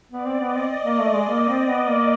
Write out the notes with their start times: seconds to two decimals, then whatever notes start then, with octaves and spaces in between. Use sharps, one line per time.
0.11 B3 D5
0.26 C4
0.40 B3 D#5
0.56 C4
0.85 A#3
0.99 A3
1.14 G#3
1.29 A#3
1.49 C4
1.68 B3
1.88 A#3